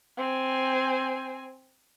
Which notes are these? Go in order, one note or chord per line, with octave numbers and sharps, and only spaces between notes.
C4 G#5